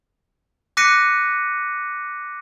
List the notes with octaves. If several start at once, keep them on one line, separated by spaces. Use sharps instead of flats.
D6 F#6 A#6 B6 C#7 D#7